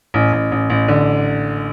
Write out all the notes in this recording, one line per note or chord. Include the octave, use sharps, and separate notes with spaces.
A1
A1
A1
A1
D3